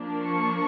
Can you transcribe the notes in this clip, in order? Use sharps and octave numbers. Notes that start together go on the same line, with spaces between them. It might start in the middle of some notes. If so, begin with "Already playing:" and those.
Already playing: F3 A#3 D4
C#6